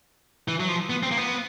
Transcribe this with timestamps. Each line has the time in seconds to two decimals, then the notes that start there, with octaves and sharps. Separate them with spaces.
0.48 E3
0.60 F#3
0.69 F3
0.90 B3
1.03 C4
1.11 A#3
1.18 B3